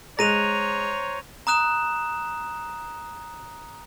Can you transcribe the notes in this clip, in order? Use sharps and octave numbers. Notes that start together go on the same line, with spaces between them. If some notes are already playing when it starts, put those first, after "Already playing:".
G#3 C5 C#5 A#5 F#6 A#6 D#7 F7
A#5 D#6 F#6 E7